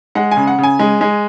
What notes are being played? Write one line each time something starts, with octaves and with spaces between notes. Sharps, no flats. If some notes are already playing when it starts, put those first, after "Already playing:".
G#3 F#5
G#5
C#3
F#5
C#3
G#5
G#3
G#3